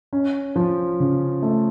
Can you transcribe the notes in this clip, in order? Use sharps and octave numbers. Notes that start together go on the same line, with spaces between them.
C#4
F3
C#3
A3